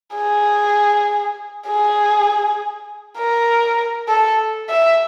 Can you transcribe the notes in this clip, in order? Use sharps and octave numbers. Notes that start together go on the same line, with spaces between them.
G#4
G#4
A#4
A4
E5